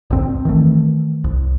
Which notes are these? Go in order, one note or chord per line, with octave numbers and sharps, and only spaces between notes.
A#1 E2 D3 C4
D#3 E3 A3
C2